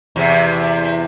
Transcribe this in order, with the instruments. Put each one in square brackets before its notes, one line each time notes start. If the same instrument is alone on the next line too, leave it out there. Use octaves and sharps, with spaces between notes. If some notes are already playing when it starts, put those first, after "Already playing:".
[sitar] E2 C3